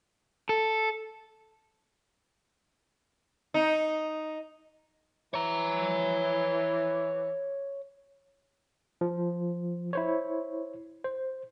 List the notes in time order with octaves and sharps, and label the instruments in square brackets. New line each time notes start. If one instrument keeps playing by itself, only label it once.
[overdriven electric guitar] A4
[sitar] D#4
[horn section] E3 [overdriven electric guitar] C#5 A#5
[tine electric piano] F3
E4 C5 C#5
C5